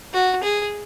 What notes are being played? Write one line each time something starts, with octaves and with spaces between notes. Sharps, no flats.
F#4
G#4